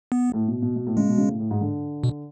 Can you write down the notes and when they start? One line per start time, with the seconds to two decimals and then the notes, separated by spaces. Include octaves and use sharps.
0.12 B3
0.33 A2
0.48 B2
0.62 B2
0.76 B2
0.87 A2
0.97 C#3 G#3
1.08 B2
1.18 C#3
1.29 A2
1.40 A2
1.51 G#2
1.61 D3
2.04 B2